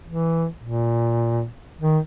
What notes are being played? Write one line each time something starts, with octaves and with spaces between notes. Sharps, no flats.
E3
A#2
D#3